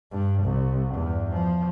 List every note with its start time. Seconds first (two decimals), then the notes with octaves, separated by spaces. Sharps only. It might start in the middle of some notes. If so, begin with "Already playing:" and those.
0.12 G2
0.43 C2
0.94 E2 G2
1.33 F3